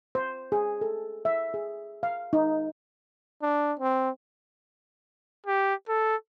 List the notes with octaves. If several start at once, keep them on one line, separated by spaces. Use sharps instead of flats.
C5
G#4
A4
E5
G#4
F5
D#4
D4
C4
G4
A4